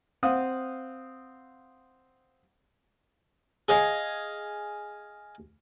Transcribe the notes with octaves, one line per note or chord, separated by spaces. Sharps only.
C4 F5 F#5 D#6
G#4 D#5 F5 G#5